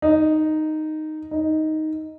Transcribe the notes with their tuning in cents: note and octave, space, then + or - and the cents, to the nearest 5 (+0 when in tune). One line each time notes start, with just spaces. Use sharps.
D#4 -5
D#4 +5